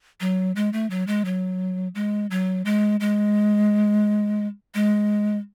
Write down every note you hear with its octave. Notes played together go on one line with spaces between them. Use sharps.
F#3
G#3
A3
F#3
G#3
F#3
G#3
F#3
G#3
G#3
G#3